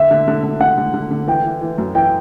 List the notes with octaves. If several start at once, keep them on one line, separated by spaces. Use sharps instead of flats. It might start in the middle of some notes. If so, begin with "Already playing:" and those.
Already playing: D3 E5
D3
D3
D3
D3 F#5
D3
D3
D3
E3 G5
E3
E3
F#2
E3 G5